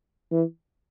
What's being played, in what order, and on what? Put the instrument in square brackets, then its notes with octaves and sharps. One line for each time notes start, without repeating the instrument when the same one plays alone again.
[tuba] E3